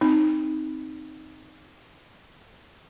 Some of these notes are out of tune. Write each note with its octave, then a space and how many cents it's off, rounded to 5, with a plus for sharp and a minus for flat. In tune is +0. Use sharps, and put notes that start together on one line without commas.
C4 +0 D#4 +0